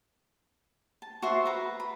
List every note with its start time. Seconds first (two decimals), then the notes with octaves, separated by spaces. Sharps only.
1.02 A5
1.22 F#4 C5 E5 C6
1.45 B4 A#5
1.80 B5